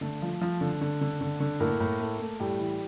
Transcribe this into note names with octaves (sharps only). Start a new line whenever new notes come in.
D3 A3 A4
F3
F3
D3
D3
D3
D3
D3
A2 A#3 A#4
A2
A3
A3
A2 G3 G4
E3